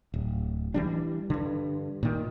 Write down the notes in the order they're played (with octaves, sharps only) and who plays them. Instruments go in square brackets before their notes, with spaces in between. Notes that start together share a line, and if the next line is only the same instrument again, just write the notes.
[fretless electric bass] D1
E3 G3 D4
G2 D3
A#2 D#3